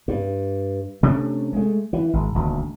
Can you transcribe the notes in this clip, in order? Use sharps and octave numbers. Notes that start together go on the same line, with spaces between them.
G2
C3 A3 C#4 D4
G#3 A3
E3
G#1
D#1 D2